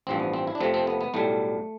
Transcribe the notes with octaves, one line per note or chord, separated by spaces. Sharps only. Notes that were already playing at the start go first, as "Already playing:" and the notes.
A1 G2 F3 C4
B3
C4
E4
D4
F2 C3 F3 A3 C4
C4
B3
B3
B1 A2 G3 A3